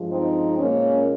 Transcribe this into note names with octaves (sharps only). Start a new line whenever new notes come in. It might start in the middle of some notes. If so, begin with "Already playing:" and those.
Already playing: G2 F3 G#3
C4 D#4
A#2 G#3 A#3 C#4